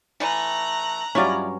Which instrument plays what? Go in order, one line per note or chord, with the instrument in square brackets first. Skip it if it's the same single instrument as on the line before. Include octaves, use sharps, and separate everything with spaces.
[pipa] E3 A3 [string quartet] A#5 F#6
[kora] G2 F#3 C#4 [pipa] E4 F4 D5